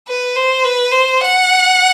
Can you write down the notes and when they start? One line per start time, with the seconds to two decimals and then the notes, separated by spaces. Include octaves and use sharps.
0.08 B4
0.36 C5
0.64 B4
0.92 C5
1.21 F#5